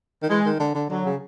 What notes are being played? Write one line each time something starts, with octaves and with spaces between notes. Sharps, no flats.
D#3
E3 G#3
D#3
D3
D3
D3 F#3
C#3